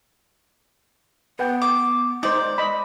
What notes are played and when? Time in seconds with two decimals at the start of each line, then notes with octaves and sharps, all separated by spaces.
1.39 B3 B4 F#5 G5
1.62 D6
2.23 G#3 D#4 C5 D5
2.58 D#5 B5